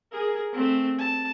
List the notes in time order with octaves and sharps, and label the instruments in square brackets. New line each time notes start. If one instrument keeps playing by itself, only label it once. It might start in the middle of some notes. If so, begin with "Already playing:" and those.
[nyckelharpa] G#4 A#4
A3 C4
A5